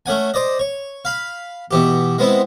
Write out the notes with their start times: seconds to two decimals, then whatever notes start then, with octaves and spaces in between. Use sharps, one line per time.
0.06 A3 C#4 F#5 G#5
0.34 C5 D5 D#5
0.59 C#5
1.05 F5 B5
1.71 B2 E3 G4
2.18 G#3 B3 C4 E4